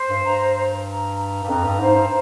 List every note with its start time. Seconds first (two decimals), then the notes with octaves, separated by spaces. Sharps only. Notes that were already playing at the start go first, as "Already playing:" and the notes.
Already playing: C5
0.09 G2
0.25 G2 A#5
0.56 A#5
0.87 A#5
1.18 A#5
1.43 G2
1.49 F2 A#5
1.64 G2
1.79 G#2 C5
1.95 G2